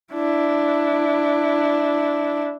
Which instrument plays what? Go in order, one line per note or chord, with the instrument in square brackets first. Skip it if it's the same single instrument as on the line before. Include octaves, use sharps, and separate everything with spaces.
[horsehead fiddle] D4 E4